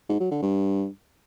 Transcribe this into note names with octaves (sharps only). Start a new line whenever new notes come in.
G#2
F#3
D3
G2